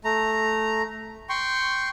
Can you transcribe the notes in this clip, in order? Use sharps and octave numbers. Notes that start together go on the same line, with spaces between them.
A3 A#5
G5 C6 C#6